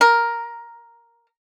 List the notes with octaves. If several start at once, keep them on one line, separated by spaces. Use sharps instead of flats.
A#4